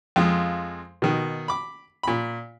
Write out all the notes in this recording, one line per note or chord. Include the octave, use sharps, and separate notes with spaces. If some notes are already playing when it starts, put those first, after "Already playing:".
F2 G#3 F4
B2 D#3
B5 D6
A#2 B5